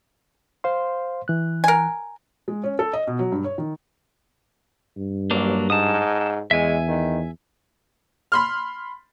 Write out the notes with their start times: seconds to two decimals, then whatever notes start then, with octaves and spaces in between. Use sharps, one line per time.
0.64 C5 F5 C6
1.28 E3 F#6
1.64 A#4 G#5
2.48 G#3
2.64 C#4
2.79 A4
2.93 D#5
3.07 B2
3.19 F#3
3.32 G2
3.44 C#5
3.58 D#3
4.97 G2
5.31 A1 F#3 A#3 D4
5.70 G#2 A5 D#6
6.51 E2 G#3 E5 G#5
6.88 D#3
8.32 B5 C6 F6